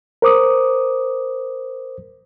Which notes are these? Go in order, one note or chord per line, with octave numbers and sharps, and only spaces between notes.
A#4 C5 D6 D#6